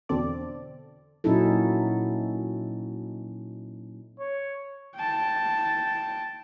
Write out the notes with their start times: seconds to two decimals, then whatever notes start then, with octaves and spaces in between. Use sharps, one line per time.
0.09 E2 B2 D3 C4 A4 D5
1.24 A#2 F#3 C#4 D#4 E4 A4
4.20 C#5
4.95 G5 A5